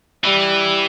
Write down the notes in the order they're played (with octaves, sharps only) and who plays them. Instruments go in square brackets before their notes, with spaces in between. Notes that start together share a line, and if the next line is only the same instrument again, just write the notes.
[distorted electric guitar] E3 [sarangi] G3